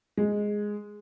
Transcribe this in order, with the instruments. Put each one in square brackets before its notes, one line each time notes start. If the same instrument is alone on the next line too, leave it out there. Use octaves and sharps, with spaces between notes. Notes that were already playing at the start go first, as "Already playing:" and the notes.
[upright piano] G#3